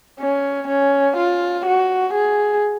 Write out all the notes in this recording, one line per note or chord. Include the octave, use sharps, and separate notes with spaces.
C#4
C#4
F4
F#4
G#4